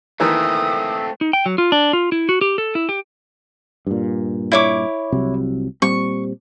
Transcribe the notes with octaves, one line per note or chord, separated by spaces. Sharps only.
D#3 E3 A3 A#3 C4 D#6 E6
D#4
G5
F#3
F4
D4
F4
E4
F#4
G4
A4
E4
G4
G2 A#2
E4 C#5 D6
C2 C3 F#3
A#2 G3 C4 C#6